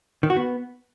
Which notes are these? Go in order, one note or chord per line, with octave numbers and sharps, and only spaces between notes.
D#3
F#4
B3